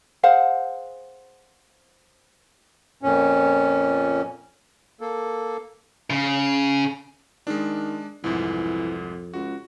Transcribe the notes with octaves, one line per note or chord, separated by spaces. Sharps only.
G#4 C5 F5 F#5
F2 A#2 C#4
A#3 A4
C#3
D#3 G#3 D4
C2 F2 G#2 E3
C#2 F#4